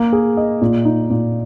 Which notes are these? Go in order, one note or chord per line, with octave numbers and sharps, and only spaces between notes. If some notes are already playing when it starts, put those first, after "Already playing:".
Already playing: A#3
G#4
D#5
A#2
D#4
A#2